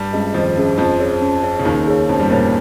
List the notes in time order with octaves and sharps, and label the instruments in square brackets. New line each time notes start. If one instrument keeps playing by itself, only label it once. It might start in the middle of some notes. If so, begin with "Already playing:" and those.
Already playing: [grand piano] G2 G3
[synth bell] G#3 C#4 G#4 D#5
[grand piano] F2 F3 [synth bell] D#3
[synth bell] G#3 C#4 G#4 D#5
[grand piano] F2 F3 [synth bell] C#4
[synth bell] G#4 C#5
C#4
G#4 C#5
[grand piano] C#3
[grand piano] D#2 D#3 [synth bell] C#4
[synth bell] G#4 C#5
[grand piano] F2 F3 [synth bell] C#4
[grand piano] G2 G3
[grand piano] A#2 A#3 [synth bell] G#4 C#5